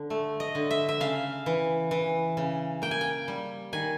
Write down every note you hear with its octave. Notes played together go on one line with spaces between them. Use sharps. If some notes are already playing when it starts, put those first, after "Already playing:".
Already playing: D3
A3
D#5
D3
E5
E5
C#3 F5
E3
E3
C#3
A#3 G5
G#5
G5
G3
D#3 G#5